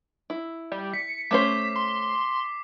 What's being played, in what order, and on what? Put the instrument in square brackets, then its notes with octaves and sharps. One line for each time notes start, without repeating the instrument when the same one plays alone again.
[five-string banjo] E4
[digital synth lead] G3
[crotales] B6 [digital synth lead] C#7
[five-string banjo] A3 C#4 C5 [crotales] D6 C7 [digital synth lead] B6
[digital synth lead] C6